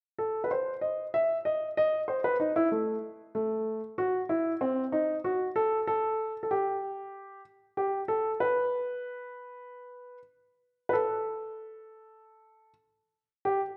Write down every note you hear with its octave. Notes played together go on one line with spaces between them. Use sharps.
A4
B4
C5
D#5
E5
D#5
D#5
C5
B4
D#4
E4
A3
A3
F#4
E4
C4
D#4
F#4
A4
A4
A4
G4
G4
A4
B4
B4
A4
G4